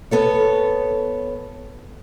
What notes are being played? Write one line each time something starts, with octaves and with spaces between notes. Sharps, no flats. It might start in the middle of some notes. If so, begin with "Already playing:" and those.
B3 A4 C#5